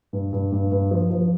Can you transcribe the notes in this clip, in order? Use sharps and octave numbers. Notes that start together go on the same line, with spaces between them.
G2
G2
G2
G2
F3
F3